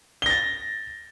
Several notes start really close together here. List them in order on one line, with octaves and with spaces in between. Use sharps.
G7 A#6 A6